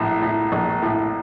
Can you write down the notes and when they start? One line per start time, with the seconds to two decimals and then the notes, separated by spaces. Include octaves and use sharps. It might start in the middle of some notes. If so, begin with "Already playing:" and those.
Already playing: A#1 A2
0.22 A2
0.52 A#1
0.82 A2